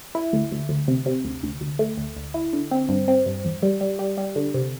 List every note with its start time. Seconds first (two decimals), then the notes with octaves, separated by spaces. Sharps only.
0.15 E4
0.33 D2
0.51 D2
0.69 D2
0.88 C3
1.06 C3
1.25 D2
1.43 D2
1.61 D2
1.79 A3
1.98 D2
2.17 D2
2.34 E4
2.53 D3
2.71 C4
2.89 G2
3.08 C4
3.26 G2
3.45 E2
3.63 G3
3.81 G3
3.99 G3
4.17 G3
4.36 D3
4.54 C3